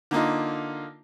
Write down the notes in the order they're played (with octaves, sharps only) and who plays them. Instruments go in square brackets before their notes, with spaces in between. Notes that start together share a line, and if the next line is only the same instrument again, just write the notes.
[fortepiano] D3 A#3 D#4 F4